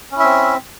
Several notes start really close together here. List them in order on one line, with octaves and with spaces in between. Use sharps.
C#4 E4 E5 C4